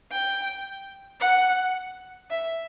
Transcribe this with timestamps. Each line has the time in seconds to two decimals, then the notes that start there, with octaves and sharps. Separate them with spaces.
0.12 G5
1.20 F#5
2.31 E5